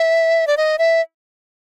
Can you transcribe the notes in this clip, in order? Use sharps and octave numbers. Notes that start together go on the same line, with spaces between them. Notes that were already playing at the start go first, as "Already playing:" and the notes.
Already playing: E5
D5
D#5
E5